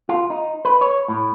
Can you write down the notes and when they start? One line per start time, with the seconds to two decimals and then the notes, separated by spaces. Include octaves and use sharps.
0.09 F4
0.30 D#4
0.65 B4
0.81 C#5
1.08 A2